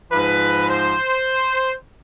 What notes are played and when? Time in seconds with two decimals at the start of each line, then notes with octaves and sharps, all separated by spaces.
0.11 G#2 F3 B4
0.70 C5